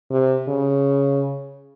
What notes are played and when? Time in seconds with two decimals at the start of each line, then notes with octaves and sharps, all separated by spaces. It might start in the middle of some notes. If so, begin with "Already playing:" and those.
0.11 C3
0.48 C#3